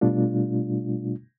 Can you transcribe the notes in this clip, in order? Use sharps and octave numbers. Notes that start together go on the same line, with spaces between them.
B2 G3 A3 D4 F4